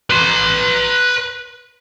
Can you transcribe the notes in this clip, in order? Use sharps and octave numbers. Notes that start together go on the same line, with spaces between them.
B4 C6